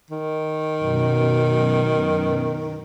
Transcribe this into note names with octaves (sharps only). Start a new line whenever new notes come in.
D#3
F#2 B2